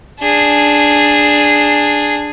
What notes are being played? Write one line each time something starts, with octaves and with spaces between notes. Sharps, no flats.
D4 G#4